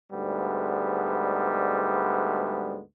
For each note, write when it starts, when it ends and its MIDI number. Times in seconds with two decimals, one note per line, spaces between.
0.12 2.81 38
0.12 2.81 44
0.12 2.81 55
0.12 2.81 56
0.12 2.81 59